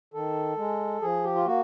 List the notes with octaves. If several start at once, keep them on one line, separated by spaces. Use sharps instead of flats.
D#3 A4
G#3
F3 G#4
G4
F4
A#3 F#4